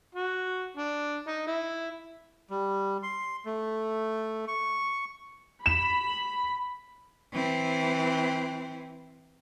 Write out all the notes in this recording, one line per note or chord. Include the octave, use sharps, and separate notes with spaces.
F#4
D4
D#4
E4
G3
C6
A3
C#6
B5 E7
E3 C4